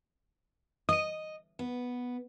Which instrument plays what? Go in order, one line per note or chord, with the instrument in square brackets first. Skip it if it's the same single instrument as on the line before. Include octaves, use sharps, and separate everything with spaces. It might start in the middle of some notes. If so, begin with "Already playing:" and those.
[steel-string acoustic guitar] D#5 [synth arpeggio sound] D#6 D#7
[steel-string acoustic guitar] B3